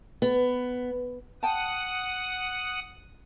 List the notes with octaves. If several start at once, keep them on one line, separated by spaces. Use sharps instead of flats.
B3
F#5 G5 A5 D#6